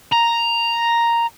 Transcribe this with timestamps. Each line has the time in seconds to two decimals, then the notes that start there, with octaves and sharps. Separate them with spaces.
0.13 A#5